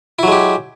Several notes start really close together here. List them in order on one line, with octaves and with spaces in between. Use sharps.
E4 F#3 G#3 G4